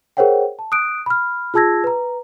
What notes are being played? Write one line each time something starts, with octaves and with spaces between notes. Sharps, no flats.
G#4 A#4 C5 C#5 F#5 G5
A5
D#6 F#6 D7
B5 F6
F4 G#4 A5 E6 G#6 A#6
B4 A#5